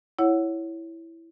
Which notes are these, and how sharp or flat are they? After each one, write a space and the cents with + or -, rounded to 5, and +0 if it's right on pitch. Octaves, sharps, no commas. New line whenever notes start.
E4 +0 C#5 +0 F#5 +0